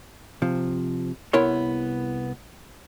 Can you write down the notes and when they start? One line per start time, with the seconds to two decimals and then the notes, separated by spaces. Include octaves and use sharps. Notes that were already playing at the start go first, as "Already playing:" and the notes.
0.42 C3 F3
1.33 C2 B3 E4 A#4 C#5 C6